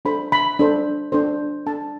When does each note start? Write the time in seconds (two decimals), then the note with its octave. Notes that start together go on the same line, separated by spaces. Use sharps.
0.05 D4 A4 C5 B5
0.32 B5
0.59 D4 A4 C5
1.12 D4 A4 C5
1.66 D4 A4 C5 A5